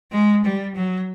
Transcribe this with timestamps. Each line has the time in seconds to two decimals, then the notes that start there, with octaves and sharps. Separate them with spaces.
0.12 G#3
0.44 G3
0.76 F#3